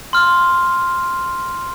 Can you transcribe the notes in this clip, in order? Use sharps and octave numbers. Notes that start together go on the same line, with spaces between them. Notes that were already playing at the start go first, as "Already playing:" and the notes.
C6 F6